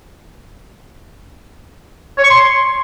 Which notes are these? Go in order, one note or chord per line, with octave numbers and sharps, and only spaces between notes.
C#5
C#6
C6